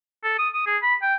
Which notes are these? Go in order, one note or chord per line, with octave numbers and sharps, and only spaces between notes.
A4
D#6
D#6
G#4
B5
G5